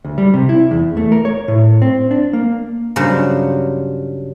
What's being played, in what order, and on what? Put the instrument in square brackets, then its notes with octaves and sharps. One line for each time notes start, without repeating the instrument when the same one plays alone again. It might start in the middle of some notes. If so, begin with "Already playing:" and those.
[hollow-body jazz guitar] D2
G3
C3
E4
E2
A3
A#4
C#5
A2
C4
D4
A#3
[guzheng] G2 C#3 F#3 C#4 F#4 C5